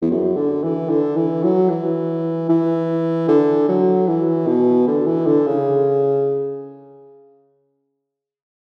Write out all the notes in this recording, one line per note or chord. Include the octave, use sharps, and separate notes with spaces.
E2
F#2
D3
E3
D3
E3
F#3
E3
E3
D3
F#3
E3
B2
D3
E3
D3
C#3